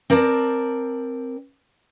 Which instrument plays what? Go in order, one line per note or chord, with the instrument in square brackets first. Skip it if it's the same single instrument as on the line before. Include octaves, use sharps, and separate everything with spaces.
[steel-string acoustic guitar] C4 A#4 D5 G#5 A5